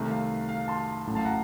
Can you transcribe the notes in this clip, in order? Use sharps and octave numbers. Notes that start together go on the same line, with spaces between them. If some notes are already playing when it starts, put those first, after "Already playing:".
Already playing: C2 C3 D#3 A3
F5
F5
F5
A5 C6
A1 A2 F#3 A3
F5 A5
F#5 A#5